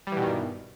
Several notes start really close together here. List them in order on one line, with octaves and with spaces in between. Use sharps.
G3 E3 B2 D#3 G2